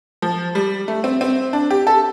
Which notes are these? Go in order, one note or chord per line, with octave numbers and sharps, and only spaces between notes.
F3
G3
A3
C4
C4
D4
G4
A4